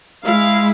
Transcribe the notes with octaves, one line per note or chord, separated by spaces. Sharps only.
G#3 E4 F5